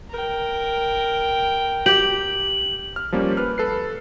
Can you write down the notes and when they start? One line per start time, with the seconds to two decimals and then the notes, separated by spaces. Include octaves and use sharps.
0.10 A#4 G5
1.86 G4 F#7
2.96 F6
3.12 F3 G3 A#3 C#4
3.37 B4 F6
3.58 A4 B4 C7